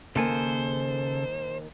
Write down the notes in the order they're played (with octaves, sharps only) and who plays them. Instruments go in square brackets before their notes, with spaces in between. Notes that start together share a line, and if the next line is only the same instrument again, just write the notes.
[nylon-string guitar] D#2 A#3 [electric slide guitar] C#3 A4 G#5 [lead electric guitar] C5